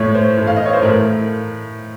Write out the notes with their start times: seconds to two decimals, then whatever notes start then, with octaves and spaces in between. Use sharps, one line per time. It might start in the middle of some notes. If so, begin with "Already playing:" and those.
Already playing: A2 A3 C#5
0.15 C5
0.37 A2 A3
0.47 F5
0.57 D#5
0.66 C#5
0.73 C5
0.82 A2 A3 A#4